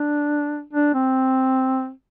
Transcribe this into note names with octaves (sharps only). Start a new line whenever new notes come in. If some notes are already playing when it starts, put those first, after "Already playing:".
Already playing: D4
D4
C4